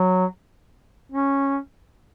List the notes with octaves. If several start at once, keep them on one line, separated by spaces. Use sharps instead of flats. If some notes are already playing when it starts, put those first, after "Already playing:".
Already playing: F#3
C#4